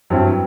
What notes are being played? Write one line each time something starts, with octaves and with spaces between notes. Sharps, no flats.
G2 F#3 C4 E4